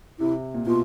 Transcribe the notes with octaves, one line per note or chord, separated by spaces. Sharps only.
C3 E4
A#2
B2 F4